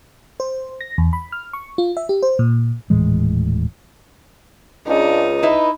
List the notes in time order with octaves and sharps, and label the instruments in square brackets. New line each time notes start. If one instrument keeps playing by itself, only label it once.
[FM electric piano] C5
A#6
E2
B5
F6
C#6
F4
E5
G4
C5
A#2
[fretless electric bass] D#1 A2 E3 G#3
[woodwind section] C#2 [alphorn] D4 [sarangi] D#4
[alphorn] D#4 [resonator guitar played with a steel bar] E4 B4